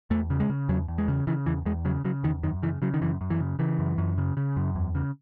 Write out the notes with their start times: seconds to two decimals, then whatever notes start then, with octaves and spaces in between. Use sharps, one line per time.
0.10 E2 A3
0.30 C#3
0.40 G#3
0.50 C#3
0.69 E2 F#3
0.88 E2
0.98 G#3
1.08 C#3
1.27 C#3 E3
1.46 E2 E3
1.66 E2 G#3
1.85 C#3 F#3
2.05 C#3 F#3
2.23 E2 D#3
2.43 F#2 D#3
2.63 C#3 E3
2.82 C#3 F#3
2.94 D#3
3.01 F#2 E3
3.21 F#2
3.30 E3
3.40 C#3
3.59 C#3 E3
3.79 F#2
3.98 F#2
4.18 C#3
4.37 C#3
4.57 F#2
4.75 E2
4.95 C#3